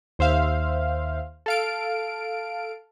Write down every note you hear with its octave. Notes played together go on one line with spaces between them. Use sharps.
D#2 C5 E5 F5
A4 F5 D7